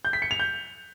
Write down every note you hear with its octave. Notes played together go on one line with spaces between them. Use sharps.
G6
B6
C#7
F7
G6